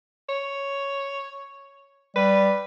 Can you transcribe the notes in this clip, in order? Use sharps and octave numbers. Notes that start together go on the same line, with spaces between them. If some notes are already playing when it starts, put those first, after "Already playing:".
C#5
G3 B4